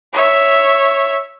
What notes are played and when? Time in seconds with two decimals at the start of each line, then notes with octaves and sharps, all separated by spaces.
0.13 C#5 E5